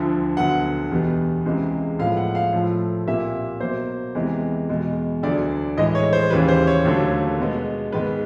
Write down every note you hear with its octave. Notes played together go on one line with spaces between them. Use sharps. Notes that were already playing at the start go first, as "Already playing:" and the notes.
Already playing: D2 D3 F3
D2 D3 F#3 B3 F#5
E2 B2 G3 B3
C#2 C3 E3 G#3
A2 F3 G#3 B3 F5
F#5
F5
A2 F3 A3
C2 A#2 G3 A#3 E5
B2 F#3 A#3 C5
E2 C3 E3 G#3 B3
E2 B2 G#3
D2 D3 F#3 D5
A2 E3 G#3 D#5
C#5
C5
D#2 C#3 E3 G3 B4
C5
C#5
D#2 D3 F#3 A3
B2 G#3 B3
G#2 D#3 G#3 B3 B4